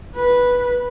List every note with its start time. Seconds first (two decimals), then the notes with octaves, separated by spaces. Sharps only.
0.16 B4